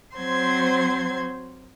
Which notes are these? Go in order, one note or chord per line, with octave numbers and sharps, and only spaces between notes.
F#3 C4 C5 C6 G#6